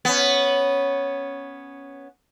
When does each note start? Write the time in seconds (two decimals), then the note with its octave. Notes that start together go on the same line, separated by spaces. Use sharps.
0.05 B3 C#4